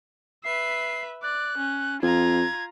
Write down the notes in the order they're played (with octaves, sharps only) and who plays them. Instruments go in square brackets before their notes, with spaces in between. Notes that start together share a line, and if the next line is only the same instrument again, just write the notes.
[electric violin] B4 E5 [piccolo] C7
[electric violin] D5 [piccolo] F#6
[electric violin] C#4
[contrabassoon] F2 [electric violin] F4 A#5 [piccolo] G#6